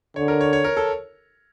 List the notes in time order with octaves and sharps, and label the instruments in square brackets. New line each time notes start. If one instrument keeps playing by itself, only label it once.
[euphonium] D3 [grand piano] C#5
[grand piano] A#4
C#5
C#5
A#4
A4